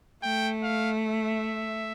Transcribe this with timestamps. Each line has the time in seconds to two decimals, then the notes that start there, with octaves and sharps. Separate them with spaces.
0.23 A3 G5
0.63 F5
1.03 E5